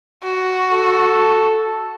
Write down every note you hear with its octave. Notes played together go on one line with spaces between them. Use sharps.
F#4
A4